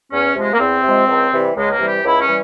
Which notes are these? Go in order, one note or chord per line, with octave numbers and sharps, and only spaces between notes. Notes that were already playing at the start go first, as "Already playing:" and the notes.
E2 C#4
C3 F3 G#3
A#3
E2 C4
C3 F3 G#3
C#2
C3 E3 G3
C#2 G#3
A#3
C3 E3 G3
G4
C#2 E4
C#4
E3 G3